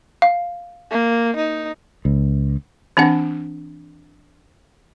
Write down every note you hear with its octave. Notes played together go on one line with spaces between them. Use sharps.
F5
A#3
D#4
C#2
E3 C4 D4 F#5